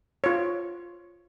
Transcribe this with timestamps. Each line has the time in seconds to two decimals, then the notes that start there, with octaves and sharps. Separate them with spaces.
0.24 F4 C#5